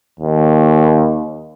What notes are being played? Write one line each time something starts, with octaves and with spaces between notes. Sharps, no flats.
D#2